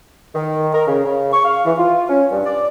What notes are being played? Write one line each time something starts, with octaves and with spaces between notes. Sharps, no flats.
D#3
A#4
C#3
C#3
C#6
F5
E3
F4
C#4
G2
D5